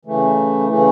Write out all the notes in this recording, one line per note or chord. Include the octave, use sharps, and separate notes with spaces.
C#3 E3 A3
C#3 E3 A3